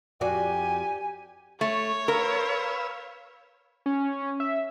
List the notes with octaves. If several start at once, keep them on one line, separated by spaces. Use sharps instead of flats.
F2 F#4 G4 D5 G#5
A3 C#5
A#4 B4 F5 E6
C#4
E5